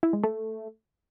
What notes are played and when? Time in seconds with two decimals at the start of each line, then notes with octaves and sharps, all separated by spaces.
0.03 E4
0.13 G#3
0.23 A3